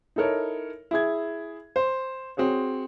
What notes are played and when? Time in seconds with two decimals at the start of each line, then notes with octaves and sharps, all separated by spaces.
0.16 D#4 E4 A4 A#4 C#5
0.91 E4 G#4 G#6
1.76 C5
2.37 C4 F#4 G#4 C#5